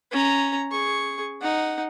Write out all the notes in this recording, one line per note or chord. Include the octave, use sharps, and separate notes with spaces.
C#4 A#5
G#4 C#6
D#4 F#5